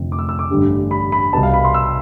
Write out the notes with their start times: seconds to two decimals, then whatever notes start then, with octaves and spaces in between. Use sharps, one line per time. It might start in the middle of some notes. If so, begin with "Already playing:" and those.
Already playing: F1 F2 D3 A3 C4
0.12 D6
0.19 E6
0.29 E6
0.39 D6
0.50 A1 G2 D3 G3 D4
0.91 B5
1.12 B5
1.33 C2 B2 B3 A5
1.43 F5
1.54 B5
1.65 C6
1.74 E6